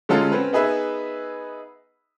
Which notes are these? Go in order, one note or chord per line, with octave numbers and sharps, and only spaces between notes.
D3 F#3 G#3 C#4 F4 A4
C4 C#4 B4
B3 D#4 G#4 B4 E5